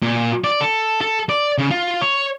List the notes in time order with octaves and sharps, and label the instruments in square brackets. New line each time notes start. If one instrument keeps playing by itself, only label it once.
[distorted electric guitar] A#2
D5
A4
A4
D5
C#3
F4
C#5